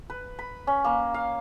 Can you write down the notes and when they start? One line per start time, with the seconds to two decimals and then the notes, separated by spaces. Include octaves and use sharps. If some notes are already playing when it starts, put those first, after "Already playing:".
0.10 B4
0.39 B5
0.67 C#4
0.84 A#3
1.14 F5